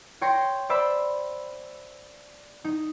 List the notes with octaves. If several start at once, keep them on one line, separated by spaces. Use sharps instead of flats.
C#5 G5 C6 G6 A#6
C5 D5 E5 B5 E6
D#4